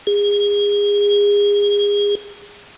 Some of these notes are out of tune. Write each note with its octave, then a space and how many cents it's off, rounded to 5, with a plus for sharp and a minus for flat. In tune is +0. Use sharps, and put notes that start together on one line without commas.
G#4 -25